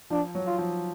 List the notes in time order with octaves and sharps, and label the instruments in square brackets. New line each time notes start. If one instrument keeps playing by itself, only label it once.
[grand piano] F3 [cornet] D4
[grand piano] F#3
[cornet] F4
[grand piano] F3